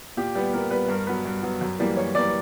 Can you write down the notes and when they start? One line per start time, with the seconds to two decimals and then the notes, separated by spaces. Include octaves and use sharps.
0.17 A#2 G4
0.35 G3 B3
0.53 A#2 A#4
0.71 G3 B3 B4
0.88 G2 A#4
1.07 F#3 B3 B4
1.25 G2
1.43 F#3 B3
1.61 F#2
1.79 E3 G3 A#3
1.97 F#2 C#5
2.15 E3 G3 A#3 D5